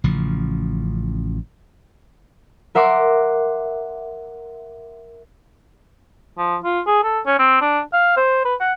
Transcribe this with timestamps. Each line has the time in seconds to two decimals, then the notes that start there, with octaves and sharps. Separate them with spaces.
0.04 A1 C#3 F3
2.75 A#4 E5 F#5 C6 D6 A#6
6.38 F3
6.64 F4
6.87 G#4
7.04 A4
7.26 C#4
7.39 C4
7.61 D4
7.93 F5
8.17 C5
8.45 B4
8.60 F#5